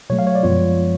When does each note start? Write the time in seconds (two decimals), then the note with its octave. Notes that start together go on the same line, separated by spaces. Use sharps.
0.10 B2 F#3 A3 C#5
0.19 F5
0.27 C#5
0.35 D5
0.43 F#2 F3 G#3 B3 F4 C#5